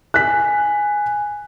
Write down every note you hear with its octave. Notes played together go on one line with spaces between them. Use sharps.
G#5 F#6 B6